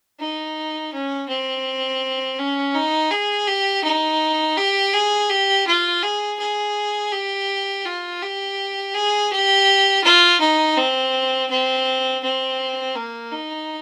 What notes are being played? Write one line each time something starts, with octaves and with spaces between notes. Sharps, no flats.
D#4
C#4
C4
C#4
D#4
G#4
G4
D#4
G4
G#4
G4
F4
G#4
G#4
G4
F4
G4
G#4
G4
F4
D#4
C4
C4
C4
A#3
D#4